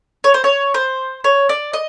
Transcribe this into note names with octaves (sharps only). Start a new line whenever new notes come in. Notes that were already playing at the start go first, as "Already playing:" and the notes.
C#5
C5
C#5
C5
C#5
D5
D#5